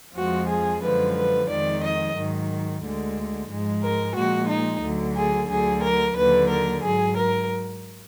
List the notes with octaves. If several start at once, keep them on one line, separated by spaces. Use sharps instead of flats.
F2 F3 G#3 F#4
G#4
F#2 D3 F3 G#3 B4
B4
F2 D#3 G#3 D5
D#5
G#2 D#3 F#3
D2 D3 G#3
G#2 F3 G#3
A#4
A#2 F3 G#3 F#4
D#4
D2 D3 F#3
G#4
D2 D3 F#3 G#4
A#4
D#2 D3 F#3 B4
A#4
G#2 F#3 G#4
A#4